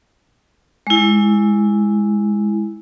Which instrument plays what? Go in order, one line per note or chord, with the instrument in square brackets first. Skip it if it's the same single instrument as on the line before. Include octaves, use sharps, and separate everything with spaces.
[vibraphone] G#3 E4